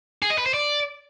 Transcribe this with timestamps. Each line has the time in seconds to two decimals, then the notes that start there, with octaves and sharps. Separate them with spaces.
0.22 G#4
0.30 D#5
0.38 B4
0.46 C5
0.54 D5